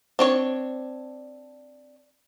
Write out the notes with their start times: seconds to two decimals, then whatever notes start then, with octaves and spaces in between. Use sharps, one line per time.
0.19 C4 D4 C#5